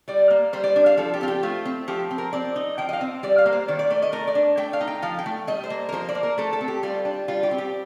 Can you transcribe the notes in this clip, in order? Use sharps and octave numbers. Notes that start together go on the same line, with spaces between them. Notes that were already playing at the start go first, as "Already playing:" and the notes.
G3 D5
A#3
G3 C5
D5
D4
F5
F3 A4
G4
C4 F4
G4
A3 F4
C4
F3 G4
C4
A#4
C4 D5
D#4
F3 G5
D#5
F5
C4
G3 D5
F5
A#3
C5
D#3 D5
D5
A3 D5
D#5
A3 A#4
D5
D4
A3 G5
F5
D#4
G5
F3 F5
G5
A3
G3 D#5
C5
A#3
A#4
F3 C5
D5
A#3
A#4
A3 A4
A4
C4
G4
G3 F4
D4
G3 F4
G4
C4
G4